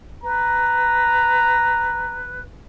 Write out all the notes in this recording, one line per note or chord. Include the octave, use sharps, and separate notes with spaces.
B4 A#5